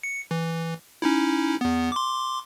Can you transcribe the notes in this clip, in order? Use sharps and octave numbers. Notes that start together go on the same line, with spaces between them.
C#7
E3
C#4 D#4 E4
E2 B3
C6 D6